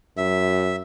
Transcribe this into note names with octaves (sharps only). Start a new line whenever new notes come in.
F#2 E5